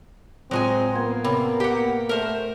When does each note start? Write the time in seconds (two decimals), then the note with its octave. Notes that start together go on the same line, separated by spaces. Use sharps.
0.51 A2 F#3 G#3 C4 F4 G#5
0.93 A#3 B3 C6 G#6
1.24 C3 C#5 B5
1.60 G4 F#5
2.09 A3 A#4 C5